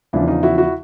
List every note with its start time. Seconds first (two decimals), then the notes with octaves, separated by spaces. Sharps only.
0.13 E2 C#3 F3 D4 E4
0.28 D#4 F4
0.43 E4 F#4
0.58 E4 F#4